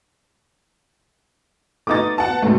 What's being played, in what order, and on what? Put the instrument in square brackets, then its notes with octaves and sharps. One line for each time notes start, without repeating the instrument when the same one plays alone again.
[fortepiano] A3 B3 D#4 [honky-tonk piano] D6 D#6 A6
[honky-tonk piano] F#5 A5
[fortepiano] B3
[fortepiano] C#2 G#2 B2 [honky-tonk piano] A3